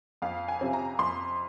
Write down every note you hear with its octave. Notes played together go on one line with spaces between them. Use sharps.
F2 F5
G#5
C3 F3 C4
A#5
F2 C6